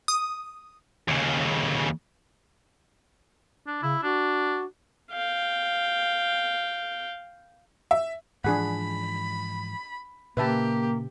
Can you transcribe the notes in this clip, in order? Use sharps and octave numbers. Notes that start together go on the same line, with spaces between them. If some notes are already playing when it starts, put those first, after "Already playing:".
D#6
D#2 C#3
D4
C#3 E4
D4 F#4
F5 G5
E5
G#2 E3 F3 D4 G#4 F#5 B5
A#2 C#3 A#3 G4 B4 E5 A5